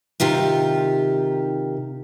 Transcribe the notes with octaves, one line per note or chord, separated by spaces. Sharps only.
C3 D#3 F4 G4